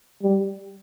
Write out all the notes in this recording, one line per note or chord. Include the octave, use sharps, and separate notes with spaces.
G3